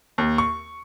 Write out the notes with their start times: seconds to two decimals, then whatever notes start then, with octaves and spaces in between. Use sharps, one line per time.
0.18 D#2
0.38 C#6